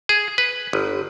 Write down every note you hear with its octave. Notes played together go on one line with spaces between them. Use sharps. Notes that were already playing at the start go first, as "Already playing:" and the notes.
G#4
B4
G1